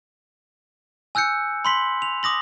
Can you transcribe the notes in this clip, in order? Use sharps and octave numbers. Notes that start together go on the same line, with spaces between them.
G#5 E6 F#6 G6 C#7
B5 C6 B6 F#7
F7
D6 D#6 A#6 F#7